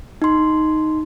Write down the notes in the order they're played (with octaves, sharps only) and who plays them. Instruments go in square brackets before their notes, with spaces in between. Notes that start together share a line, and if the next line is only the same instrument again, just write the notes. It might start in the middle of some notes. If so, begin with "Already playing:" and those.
[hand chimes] D#4 C6